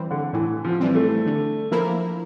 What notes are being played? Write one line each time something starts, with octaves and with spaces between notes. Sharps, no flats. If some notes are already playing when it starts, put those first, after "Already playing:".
Already playing: E3 G3 C4
D3
A2 E3
F3
E3 G3 C4
A3
D3
F3 A#3 E4 A#4